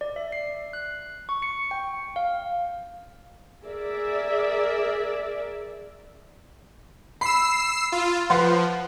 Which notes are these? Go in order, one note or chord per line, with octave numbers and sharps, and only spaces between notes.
D5
E5
C7
F#6
C#6
C#7
G5
F5
G#4 A#4 D5 E5
B5 E6 C7
F4
F3 B4 F#5 C6